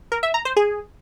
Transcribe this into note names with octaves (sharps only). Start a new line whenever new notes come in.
A#4
E5
A#5
C5
G#4